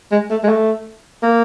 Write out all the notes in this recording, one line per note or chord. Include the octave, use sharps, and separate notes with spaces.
G#3
A3
G#3
A3
A#3